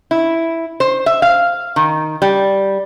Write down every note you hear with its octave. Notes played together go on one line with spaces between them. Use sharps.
E4
C5
E5
F5
D#3
G3